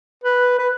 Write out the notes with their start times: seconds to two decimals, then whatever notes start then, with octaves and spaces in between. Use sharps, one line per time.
0.24 B4
0.59 B4